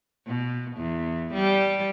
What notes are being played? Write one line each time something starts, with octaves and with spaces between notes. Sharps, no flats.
B2
E2
G3